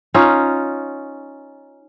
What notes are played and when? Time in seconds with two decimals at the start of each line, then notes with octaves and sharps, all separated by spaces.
0.14 C#4 D#4 F4